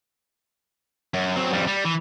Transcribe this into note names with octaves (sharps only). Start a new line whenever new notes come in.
F#2
F#3 C4
F2 G3
G3
E3